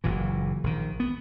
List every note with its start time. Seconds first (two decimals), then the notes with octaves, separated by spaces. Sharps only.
0.04 F#1 A#2 E3
0.64 A#1 D#3
1.00 B3